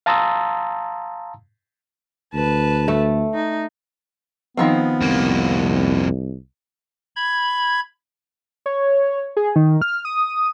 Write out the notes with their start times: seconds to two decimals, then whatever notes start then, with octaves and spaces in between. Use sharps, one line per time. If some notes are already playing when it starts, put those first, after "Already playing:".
0.06 F5 A5 A#5 C6 D#6 E6
2.34 D2 B4 A5
2.88 A3
3.34 D#4
4.57 D#3 F3 B3 C4
5.02 C2 F2 A#3
7.16 B5 G#6
8.66 C#5
9.37 G#4
9.56 D#3
9.82 F6
10.05 D#6